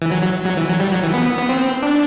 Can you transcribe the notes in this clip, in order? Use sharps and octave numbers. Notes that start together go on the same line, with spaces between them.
E3
F#3
F#3
F#3
E3
F#3
G3
F#3
E3
B3
B3
C4
D4